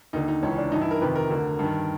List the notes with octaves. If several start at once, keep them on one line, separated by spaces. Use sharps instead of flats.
D#2 D3 D#4
D#4
C#2 C#3 E3 C#4
D4
G2 E3 D#4
E4
A#4
F2 C3 D#3 B4
A#4
D2 D3
G2 D#3